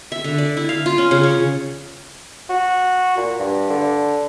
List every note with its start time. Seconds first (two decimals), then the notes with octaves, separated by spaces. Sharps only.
0.12 E5
0.24 D3
0.38 D5
0.57 E4
0.69 F5
0.86 F4
0.98 C#4
1.11 C#3
1.23 C#5
2.49 F#4
3.17 A#2
3.39 G2
3.70 D3